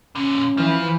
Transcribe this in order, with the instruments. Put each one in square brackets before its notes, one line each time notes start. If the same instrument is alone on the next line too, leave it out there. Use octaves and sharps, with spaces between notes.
[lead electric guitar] A#2 D3 [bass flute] C#4
[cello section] E3 [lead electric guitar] F3